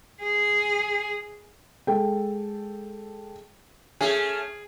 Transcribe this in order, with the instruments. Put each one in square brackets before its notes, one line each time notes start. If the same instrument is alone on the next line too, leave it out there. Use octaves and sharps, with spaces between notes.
[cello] G#4
[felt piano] G#3 A4 G5
[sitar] A3 C#4 [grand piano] G#4